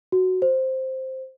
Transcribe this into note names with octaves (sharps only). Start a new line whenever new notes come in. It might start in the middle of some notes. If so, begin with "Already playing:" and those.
F#4
C5